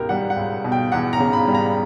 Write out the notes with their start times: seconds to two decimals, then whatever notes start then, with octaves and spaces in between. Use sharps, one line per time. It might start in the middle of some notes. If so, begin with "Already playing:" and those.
Already playing: C#2 B2 G4 A#4
0.09 G3 F#5
0.30 F#5
0.37 C#2
0.64 B2
0.72 G5
0.92 E2 F#5
1.13 A#5
1.20 C#3
1.33 B5
1.48 G3
1.54 A#5